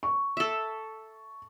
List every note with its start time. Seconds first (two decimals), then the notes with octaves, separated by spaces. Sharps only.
0.03 C#6
0.37 A4 E5